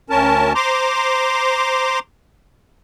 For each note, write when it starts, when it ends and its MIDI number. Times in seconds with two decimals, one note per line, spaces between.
0.10 0.53 38
0.10 0.53 61
0.10 0.53 70
0.10 0.53 81
0.55 1.99 72
0.55 1.99 82
0.55 1.99 84
0.55 1.99 86